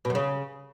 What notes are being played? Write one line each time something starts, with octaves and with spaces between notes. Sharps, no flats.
B2
F#2
C#3